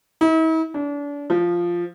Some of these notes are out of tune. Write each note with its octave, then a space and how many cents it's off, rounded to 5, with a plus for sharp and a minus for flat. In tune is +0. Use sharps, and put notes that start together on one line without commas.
E4 -45
D4 -35
F3 -5